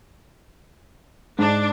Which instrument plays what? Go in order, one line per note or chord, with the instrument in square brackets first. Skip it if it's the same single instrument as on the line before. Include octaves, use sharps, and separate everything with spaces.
[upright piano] G#2 [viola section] D4